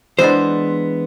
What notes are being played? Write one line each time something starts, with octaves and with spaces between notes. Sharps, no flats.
E3 G#3 B3 D4 C5